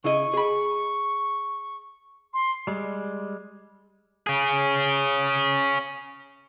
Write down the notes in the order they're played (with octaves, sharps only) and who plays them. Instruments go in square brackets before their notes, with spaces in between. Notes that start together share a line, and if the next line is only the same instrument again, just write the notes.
[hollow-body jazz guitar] C#3 E4 D#5 [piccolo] C#6
[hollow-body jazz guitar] G#4 B5
[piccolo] C6
[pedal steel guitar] G3 G#3
[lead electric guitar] C#4 G#4